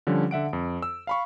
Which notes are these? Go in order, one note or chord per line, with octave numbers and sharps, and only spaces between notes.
D3 F3 G3 C#4
D3 E5 F#5 D7
F2
E6
F5 B5 C#6